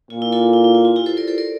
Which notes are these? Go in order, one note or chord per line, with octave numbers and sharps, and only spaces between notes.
A#2 F4
E4
F4 A4
E4
E4
F4
F4
E4 G4
A4 C5
A#4 D5
A4 C5
A#4 D5